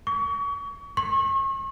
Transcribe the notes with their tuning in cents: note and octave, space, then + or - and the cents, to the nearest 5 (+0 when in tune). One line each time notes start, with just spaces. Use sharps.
C#6 +35
C#6 -40